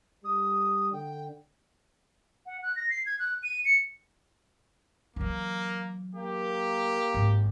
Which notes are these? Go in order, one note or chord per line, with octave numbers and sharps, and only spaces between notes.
G3 D#6
D3 G5
F#5
F#6
A#6
C7
G#6
F#6
D#7
C#7
E3 F#3 A#3
A#3 G4
G#1